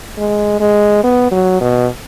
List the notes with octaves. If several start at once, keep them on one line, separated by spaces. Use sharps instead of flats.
G#3
G#3
B3
F#3
B2